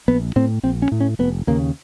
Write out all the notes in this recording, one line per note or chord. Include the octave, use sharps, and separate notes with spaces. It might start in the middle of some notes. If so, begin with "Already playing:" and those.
A#1 B3
A2 C4
A#1 C4
C#4
A2
C#4
F1 B3
D#2 C#3 A#3